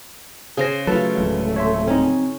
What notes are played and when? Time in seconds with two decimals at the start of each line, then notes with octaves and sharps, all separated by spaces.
0.57 C#3 G#4 C5 A#6
0.87 F#3 A3 F4 F#4 A4 B4 A5
1.18 D1 F#3 G#3
1.56 C#5 E5 C6
1.87 C4 C#4 D#4